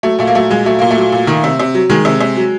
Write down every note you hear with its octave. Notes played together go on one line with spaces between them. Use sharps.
F#3 A3
A#2 A3
A#3
F#3 A3
A#2 G#3
F#3 A3
A#2 A#3
A3
F#3
A#2
D#3
C3
C3
F#3
D#3 G#3
C3
C3
F#3